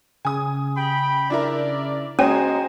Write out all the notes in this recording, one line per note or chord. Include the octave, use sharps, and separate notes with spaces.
C#3 G#5 D#6
G5 B5
D4 E4 A#4 D5
G#3 C#4 F#4 C5 D#5 G#5 A#5